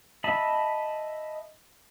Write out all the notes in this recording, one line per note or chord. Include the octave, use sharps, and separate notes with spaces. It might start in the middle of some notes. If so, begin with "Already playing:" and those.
D#5 E5 A5 B5